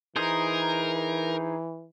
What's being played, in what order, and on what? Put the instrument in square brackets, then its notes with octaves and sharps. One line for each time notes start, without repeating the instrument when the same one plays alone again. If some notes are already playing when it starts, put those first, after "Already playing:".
[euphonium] E3 [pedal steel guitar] D#4 G#4 C5 [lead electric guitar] A#4